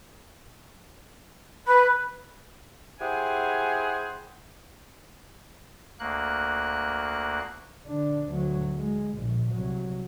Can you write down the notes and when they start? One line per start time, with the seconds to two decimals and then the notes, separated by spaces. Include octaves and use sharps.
1.67 B4 B5
3.00 E4 G4 G#4 C5 F#5 G#5
6.00 D2 A#3 F#6
7.85 D3 D4
8.28 D2 F#3
8.76 G#3
9.15 A#1 A2
9.50 C2 F#3